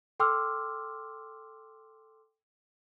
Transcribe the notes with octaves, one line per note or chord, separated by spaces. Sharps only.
A4 G5 C6 D6 E6 F6